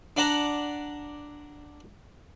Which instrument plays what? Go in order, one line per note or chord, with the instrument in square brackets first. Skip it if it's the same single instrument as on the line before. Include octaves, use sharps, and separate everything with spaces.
[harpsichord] D4 D5 F#5 A5 A#5